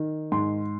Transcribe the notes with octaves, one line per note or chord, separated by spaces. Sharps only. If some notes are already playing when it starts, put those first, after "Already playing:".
Already playing: D#3
G#2 C6